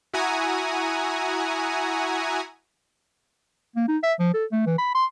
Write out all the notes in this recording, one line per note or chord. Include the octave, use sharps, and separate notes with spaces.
E4 F#4 F#5 G#5 A#5 D#6
A#3
D#4
E5
F3
A4
A3
E3
B5
C6